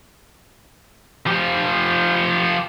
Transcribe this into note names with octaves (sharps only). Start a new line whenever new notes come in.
F3 G4